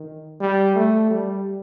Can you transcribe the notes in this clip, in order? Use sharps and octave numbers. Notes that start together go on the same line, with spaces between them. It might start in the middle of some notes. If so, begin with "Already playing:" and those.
Already playing: D#3
G3
A3
G3